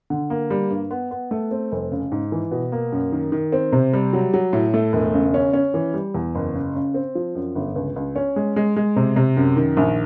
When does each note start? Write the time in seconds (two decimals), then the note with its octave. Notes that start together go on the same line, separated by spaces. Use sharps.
0.10 D3
0.30 A#3
0.50 G3
0.70 G2
0.91 B3
1.11 B3
1.31 A3
1.51 C4
1.72 F1
1.92 C#3
2.12 G#2
2.32 E3
2.51 B2
2.72 A#3
2.92 F#2
3.12 D#3
3.32 D#3
3.52 C4
3.73 C3
3.93 G3
4.13 F#3
4.34 F#3
4.53 A2
4.74 A3
4.93 E1
5.14 C#3
5.34 C#4
5.53 C#4
5.74 E3
5.94 G3
6.14 E2
6.35 F#1
6.54 C#3
6.75 C#3
6.94 C4
7.15 F3
7.35 F#2
7.55 G1
7.75 C#2
7.96 C#2
8.16 C#4
8.36 G#3
8.56 G#3
8.77 G#3
8.96 C3
9.16 C3
9.37 F#2
9.56 D#3
9.77 A#1